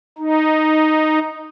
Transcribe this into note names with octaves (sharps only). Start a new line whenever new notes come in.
D#4